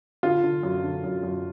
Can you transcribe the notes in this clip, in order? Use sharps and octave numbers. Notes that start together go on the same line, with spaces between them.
D3 F4
D3
F#2
D3
F#2
F#2